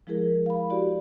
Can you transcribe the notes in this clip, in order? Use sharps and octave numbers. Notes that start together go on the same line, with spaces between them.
F3 G#3 E4 G#4 A#4
F5 B5
E4 F#4 G4 D5